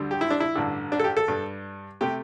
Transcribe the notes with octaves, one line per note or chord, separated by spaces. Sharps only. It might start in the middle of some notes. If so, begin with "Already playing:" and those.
Already playing: D2 D3 G3
G4
E4
D4
E4
A1 G2 D3
D4
A4
G4
A4
G2 G3
C3 A3 G4